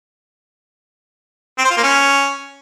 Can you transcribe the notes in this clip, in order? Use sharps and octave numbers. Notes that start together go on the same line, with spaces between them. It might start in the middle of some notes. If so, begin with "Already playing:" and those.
C4
C5
F4
A#3
C#4